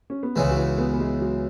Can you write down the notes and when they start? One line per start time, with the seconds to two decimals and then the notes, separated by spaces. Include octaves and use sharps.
0.10 C#4
0.23 B3
0.36 C#2 C#3 E3 G#3
0.51 F#4
0.57 E4
0.78 B3
0.93 B3
1.00 G#3
1.21 F#3